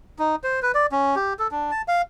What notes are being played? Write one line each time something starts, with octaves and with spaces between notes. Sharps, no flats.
D#4
C5
B4
D5
C#4
G4
A4
D4
A5
F5